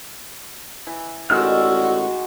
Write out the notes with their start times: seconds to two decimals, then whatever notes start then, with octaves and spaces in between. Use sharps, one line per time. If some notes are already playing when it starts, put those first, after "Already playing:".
0.87 E3
1.30 A1 D#3 G#3 F#4 D5 E6 F6